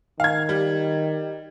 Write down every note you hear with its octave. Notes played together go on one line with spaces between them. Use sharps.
D#3 F5 G#6
G3